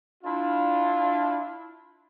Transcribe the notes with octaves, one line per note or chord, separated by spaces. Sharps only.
D4 E4 F4